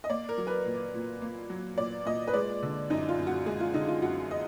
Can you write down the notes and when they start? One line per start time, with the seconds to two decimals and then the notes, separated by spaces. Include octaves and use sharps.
0.04 D#5
0.10 A#3 D5
0.29 A#4
0.38 F#3
0.47 B4
0.65 A#2
0.94 A#2
1.22 A#3
1.50 F#3
1.78 A#2 D5
2.05 A#2 D#5
2.28 B4
2.34 G#3 D5
2.62 D3
2.90 F#2 D#4
3.09 F4
3.18 F#2
3.27 F#4
3.46 G#3 G#4
3.60 F4
3.74 D3 D#4
3.88 F4
4.02 F#2 F#4
4.31 D#5